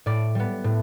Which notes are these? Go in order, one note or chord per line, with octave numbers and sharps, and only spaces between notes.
A2 D5
G3 B3
A2